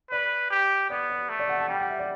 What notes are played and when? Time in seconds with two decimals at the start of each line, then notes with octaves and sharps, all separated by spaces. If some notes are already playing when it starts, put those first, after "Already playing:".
0.11 B4 D5
0.50 G4
0.90 B3 D5
1.09 D5
1.29 A3
1.39 D5
1.49 F#5
1.60 A5
1.69 G3 G5
1.80 F#5
1.88 E5
1.99 D5